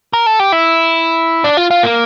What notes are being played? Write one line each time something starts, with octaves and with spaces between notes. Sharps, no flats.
A#4
A4
G4
E4
D4
F4
F4
A#3